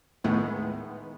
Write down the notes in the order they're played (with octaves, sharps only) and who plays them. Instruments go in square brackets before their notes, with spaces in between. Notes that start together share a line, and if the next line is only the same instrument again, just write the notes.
[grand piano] A2 [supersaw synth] D#3 G#3 B3